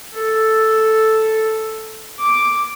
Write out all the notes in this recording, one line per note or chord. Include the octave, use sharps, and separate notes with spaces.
A4
D6